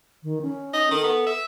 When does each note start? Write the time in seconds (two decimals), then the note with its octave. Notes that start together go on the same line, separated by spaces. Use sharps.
0.23 D#3
0.42 C#4
0.73 D#4
0.91 D#3 A4
1.04 B3
1.26 E5